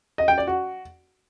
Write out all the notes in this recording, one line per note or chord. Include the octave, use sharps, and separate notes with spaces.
D#5
G5
D5
F#4